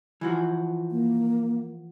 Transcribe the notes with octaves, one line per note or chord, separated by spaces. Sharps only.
E3 F3 F#4
A#3